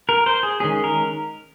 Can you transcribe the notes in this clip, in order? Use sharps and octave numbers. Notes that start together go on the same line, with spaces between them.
A#4
C5
G#4
D#3 G#3 C#4 G#4
A#4